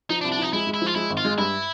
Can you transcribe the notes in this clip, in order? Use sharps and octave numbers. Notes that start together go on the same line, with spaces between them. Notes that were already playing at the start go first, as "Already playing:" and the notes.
F3 D#4
D4
C2
D4
F3 D#4
G#3 E4
G#3
E4
F3 F4
G#3 E4
G#1
F4
G#3
G2 E4